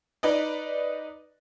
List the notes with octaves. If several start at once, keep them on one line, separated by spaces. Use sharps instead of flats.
D#4 B4 D5 D#5